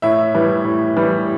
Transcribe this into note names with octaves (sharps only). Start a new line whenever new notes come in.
A2 E5
E3 G3
A2
E3 G3